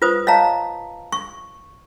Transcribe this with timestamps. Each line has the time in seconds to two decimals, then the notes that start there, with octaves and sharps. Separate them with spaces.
0.02 F4 B4 C5 D#6
0.27 C#5 D#5 F5 A5 A#5
1.12 C#6